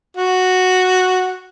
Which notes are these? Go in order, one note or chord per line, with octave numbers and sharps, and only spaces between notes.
F#4